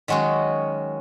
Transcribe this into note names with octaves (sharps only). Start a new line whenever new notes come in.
D#3 F#3 G#3 C#4 F#4